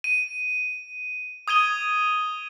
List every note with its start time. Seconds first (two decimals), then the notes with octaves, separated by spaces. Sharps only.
0.04 D#7
1.48 D#6 G#6 D#7 G7